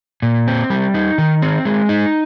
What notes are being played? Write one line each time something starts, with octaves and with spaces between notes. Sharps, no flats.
A#2
C4
G3
D#4
D#3
C4
G#3
D#4